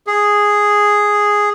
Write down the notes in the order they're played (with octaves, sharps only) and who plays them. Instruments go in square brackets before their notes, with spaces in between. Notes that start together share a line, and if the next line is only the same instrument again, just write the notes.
[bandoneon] G#4